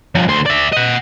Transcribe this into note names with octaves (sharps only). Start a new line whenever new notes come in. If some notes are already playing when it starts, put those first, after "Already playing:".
F3 C#4
D2 C5
D5 E5
D#5 F#5